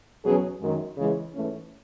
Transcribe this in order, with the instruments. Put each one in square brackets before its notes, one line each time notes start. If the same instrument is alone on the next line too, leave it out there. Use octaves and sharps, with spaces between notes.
[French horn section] E2 B2 F#3 C#4 G#4
F#2 D#3 G#3
C#3 E3 G#3
G#2 E3 A3 C#4